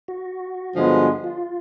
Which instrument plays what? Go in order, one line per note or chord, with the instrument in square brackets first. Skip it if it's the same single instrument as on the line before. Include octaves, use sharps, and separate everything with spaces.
[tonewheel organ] F#4
[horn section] G2 D3 F3 G#3 B3
[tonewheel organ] F4